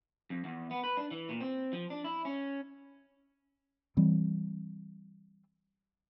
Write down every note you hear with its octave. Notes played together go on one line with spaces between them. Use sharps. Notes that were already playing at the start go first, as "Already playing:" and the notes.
F2
E2
B3
B4
D4
E3
A#2
C4
F3
D4
E4
C#4
E3 G3 C4